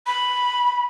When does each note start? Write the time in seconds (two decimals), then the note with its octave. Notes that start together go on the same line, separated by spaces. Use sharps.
0.07 B5